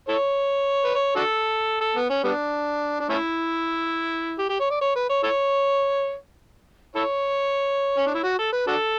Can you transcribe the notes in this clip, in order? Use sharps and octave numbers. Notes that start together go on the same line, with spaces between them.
E4 A4 C#5
B4
C#5
D4 F#4 A4
A4
B3
C#4
G3 B3 D4
D4
A3 C#4 E4
G4
G4
C#5
D5
C#5
B4
C#5
E4 A4 C#5
E4 A4 C#5
C#4
D4
E4
F#4
A4
B4
D4 F#4 A4